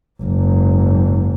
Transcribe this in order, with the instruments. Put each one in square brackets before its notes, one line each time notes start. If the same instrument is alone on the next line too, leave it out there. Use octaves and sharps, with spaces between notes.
[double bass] F#1 G#2